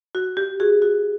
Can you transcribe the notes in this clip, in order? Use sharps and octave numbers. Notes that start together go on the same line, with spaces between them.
F#4
G4
F#4 G#4
F#4